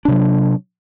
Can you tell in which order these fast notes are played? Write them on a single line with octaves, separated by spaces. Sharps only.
D4 C3 F#3